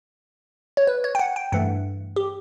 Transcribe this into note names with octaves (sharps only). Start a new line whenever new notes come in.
C#5
B4
C#5
G5
F#5
G5
G2 E3 A3 F#5
G4